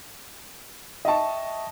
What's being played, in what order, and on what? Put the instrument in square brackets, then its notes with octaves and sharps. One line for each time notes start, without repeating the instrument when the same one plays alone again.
[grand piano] D#5 A5 [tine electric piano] E5 G5 C#6